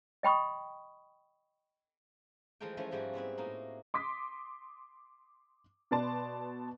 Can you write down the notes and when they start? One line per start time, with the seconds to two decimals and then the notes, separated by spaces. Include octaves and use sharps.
0.23 D#5 G5 B5 C#6 D#6
2.60 E3 F3 G#3 A3 A#4 G5
2.77 E3 F3 A3 C#4 E4
2.91 G#2 F3 G3 G#3 E4 F#4
3.13 B3 C4 E4 B4
3.37 A2 A#3 D#4 E4
3.94 C6 D6 D#6 B6
5.91 B2 B4 D5 A5 C6